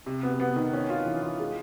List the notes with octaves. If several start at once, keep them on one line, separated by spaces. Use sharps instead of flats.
C3
B3
B3
D#3
C#4
F4
E3
F4
G#3